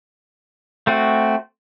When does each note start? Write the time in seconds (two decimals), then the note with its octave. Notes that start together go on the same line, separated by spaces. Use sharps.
0.87 A3 C4 F#4